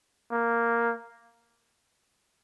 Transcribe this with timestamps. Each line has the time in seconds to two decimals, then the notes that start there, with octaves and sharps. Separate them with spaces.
0.32 A#3